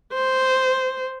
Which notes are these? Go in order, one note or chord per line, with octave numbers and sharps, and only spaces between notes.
C5